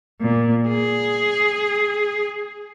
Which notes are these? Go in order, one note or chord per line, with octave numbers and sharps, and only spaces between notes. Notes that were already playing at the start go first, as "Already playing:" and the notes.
A#2
G#4